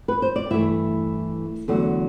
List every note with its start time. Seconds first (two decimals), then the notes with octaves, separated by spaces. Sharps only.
0.08 B4
0.22 C5
0.36 D5
0.50 G2 E3 A3 E4 E5
1.68 E2 D3 F#3 A3